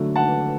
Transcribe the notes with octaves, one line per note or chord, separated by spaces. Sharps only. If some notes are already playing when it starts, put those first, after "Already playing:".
Already playing: D3 F#3 A3
F#5 A5